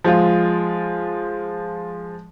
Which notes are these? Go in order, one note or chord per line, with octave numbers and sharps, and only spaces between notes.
F3 G#3 F4